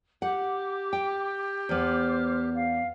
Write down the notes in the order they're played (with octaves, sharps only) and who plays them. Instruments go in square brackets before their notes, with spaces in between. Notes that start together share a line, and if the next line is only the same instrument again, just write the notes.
[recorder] G4 [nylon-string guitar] F#5 [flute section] D6
[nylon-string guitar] G5
[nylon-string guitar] E2 B3 [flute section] C5 D6 F6
[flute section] F5